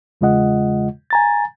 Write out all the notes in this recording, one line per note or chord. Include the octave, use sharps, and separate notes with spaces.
E2 C#3 G#3 F4 D#5 F#5
G#5 A#5 A6